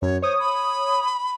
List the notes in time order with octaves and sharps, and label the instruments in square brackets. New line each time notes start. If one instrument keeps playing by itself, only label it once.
[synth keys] F#2 [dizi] C#5
[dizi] C5 [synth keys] C#5 D#6
[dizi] B5